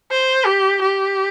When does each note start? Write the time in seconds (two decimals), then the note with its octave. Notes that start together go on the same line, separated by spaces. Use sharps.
0.11 C5
0.45 G4
0.81 G4